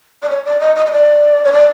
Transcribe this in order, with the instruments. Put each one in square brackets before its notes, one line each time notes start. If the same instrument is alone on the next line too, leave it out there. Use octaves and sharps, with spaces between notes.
[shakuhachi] D5
C#5
D5
D#5
D#5
D#5
D5
C#5
D5